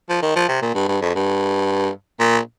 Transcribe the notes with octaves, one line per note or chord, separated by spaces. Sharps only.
F3
D#3
F3
C3
A#2
G2
G2
F2
G2
A#2